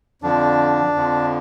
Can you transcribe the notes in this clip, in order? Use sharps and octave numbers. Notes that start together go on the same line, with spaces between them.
F2 D3 F3 D4
F2 D3 F3